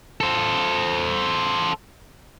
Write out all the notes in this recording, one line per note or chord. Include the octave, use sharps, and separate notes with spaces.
A4 C5